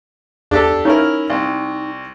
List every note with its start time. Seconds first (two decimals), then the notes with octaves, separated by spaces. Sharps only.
0.51 E2 D4 G4 A4
0.85 C#4 D#4 E4 A#4
1.30 C2